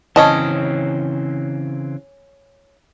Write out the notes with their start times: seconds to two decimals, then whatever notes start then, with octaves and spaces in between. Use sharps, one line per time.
0.16 C#3 E3 C4 C#4 D#5 A5